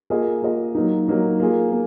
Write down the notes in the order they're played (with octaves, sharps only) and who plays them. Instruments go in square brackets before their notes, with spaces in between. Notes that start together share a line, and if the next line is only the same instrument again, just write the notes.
[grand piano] A#3 F4 G#4 D#5
A#3 F4 G#4 D#5
F#3 A#3 D#4
F#3 A#3 D#4
A#3 F4 G#4
A#3